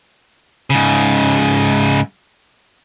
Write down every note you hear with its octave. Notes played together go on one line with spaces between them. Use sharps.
G#2 C#3